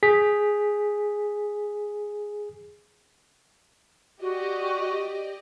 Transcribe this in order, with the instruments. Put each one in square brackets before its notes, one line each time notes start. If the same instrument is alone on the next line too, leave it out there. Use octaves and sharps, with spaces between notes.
[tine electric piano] G#4 B6
[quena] F#4 [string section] G4 D5 D#5